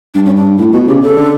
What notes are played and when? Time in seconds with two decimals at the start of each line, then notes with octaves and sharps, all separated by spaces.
0.14 G2 D4
0.26 C#4
0.36 D4
0.58 A2 E4
0.73 B2 F#4
0.87 C#3 G4
1.02 C#3 A4
1.16 D3